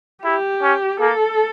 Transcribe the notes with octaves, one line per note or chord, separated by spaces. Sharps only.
E4 G4
C#4
A#3 A4